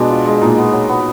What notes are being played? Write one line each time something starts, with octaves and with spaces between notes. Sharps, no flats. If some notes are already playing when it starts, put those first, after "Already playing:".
Already playing: B2 G#3 B3 D4
F4
G#3
A#2 D#4
B3
F#3
B3